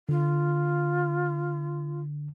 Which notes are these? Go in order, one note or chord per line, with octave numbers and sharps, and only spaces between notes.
D3 F4